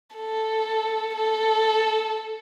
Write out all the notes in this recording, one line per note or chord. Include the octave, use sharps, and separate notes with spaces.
A4
A4